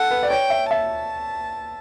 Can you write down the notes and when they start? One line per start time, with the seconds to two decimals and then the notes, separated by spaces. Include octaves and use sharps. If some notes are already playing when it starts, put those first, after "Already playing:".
Already playing: A4 F#5
0.11 B4
0.23 D5
0.30 C#5 G5
0.50 E5
0.71 E5 A5